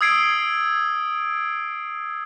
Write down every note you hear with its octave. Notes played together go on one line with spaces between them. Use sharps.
D#6 E6 G#6 C7 D7